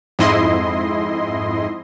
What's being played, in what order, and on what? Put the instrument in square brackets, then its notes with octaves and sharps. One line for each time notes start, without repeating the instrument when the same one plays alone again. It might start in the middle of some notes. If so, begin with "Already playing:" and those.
[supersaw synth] F2 G#2 E4 D#5 C6